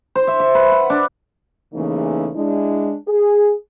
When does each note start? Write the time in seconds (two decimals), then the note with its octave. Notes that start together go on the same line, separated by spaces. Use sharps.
0.15 C5
0.27 E5
0.40 E5
0.55 B4
0.72 F#5
0.90 D4
1.74 E2 C#3 E3 A3 A#3 D#4
2.36 G#3 D4 E4
3.08 G#4